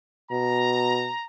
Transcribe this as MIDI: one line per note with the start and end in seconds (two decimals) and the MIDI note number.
0.31 1.10 47
0.31 1.27 82